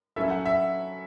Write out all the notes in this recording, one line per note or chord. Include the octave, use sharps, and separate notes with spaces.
F#3 C#4 E4 A4 E5
F#5
E5